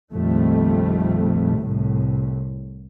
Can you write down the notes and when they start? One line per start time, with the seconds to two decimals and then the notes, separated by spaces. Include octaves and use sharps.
0.12 A#1 F2 D#3 G3 A3
1.57 C2 A2